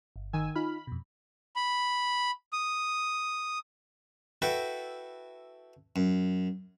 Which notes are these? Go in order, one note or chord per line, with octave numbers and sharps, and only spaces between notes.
G1
D#3 G#5 E6
D#4 F4 B5 F6
F2 B2
B5
D#6
E4 F#4 A4 B4 G5
F#2